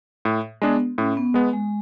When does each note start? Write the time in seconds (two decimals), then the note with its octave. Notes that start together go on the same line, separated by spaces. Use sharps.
0.25 A2
0.62 G#3 B3 D4 G#4
0.98 A2 C#4
1.17 B3
1.34 G#3 B3
1.53 G#3